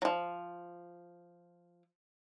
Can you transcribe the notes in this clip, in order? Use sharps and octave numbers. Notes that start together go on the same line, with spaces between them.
F3 F#3